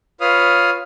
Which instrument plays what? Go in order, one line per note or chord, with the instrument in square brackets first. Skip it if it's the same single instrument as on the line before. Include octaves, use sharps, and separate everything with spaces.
[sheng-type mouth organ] F4 B4 C#5 F5 D#6 F6